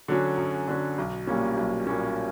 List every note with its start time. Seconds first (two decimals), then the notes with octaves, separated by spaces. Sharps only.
0.08 D3 F#3 C#4
0.37 F#2
0.68 D3 F#3 C#4
0.98 B1
1.27 A#2 G3 A#3 C#4
1.57 B1
1.87 A#2 G3 A#3 C#4